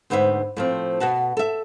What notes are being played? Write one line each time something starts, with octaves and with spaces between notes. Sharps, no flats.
D2 G#2 B3 C5 E5
A2 F3 C4
B2 B3 F#4 A5
A4 E5